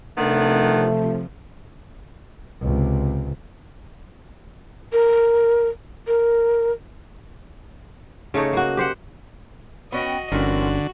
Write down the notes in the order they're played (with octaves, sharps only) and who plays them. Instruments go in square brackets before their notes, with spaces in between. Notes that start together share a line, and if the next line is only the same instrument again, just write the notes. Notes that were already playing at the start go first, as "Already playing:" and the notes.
[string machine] C3 F3 [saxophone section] D#3 B3 D4 [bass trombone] A3
[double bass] C#2 C3
[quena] A#4
A#4
[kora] C#3 A3 D#4 C#5
A#3 F#4
G4 C5 F#5
[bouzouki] B3 C#4 G5 [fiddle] F#4 D#5
[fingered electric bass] G1 C#4 [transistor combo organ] D3 [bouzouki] E3 C4 A#4 [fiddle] F#4